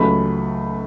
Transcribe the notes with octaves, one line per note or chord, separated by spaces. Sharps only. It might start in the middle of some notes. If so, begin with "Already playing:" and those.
Already playing: C#2 C#3 F#3 A3 B5